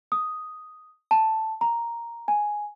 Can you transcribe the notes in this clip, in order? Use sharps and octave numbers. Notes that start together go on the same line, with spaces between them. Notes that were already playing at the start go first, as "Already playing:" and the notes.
D#6
A5
A#5
G#5